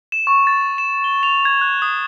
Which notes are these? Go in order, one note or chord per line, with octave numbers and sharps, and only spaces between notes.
E7
C#6
A6
E7
G7
F7
G#6
F#6
D#6